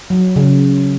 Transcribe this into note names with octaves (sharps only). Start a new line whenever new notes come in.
F#3
C#3